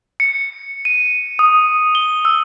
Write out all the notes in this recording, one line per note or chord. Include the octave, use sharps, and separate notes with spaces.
C#7
D#7
D#6
G7
E6